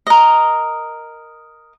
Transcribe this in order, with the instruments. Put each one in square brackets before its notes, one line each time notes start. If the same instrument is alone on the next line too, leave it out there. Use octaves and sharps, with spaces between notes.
[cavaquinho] A#4 D#5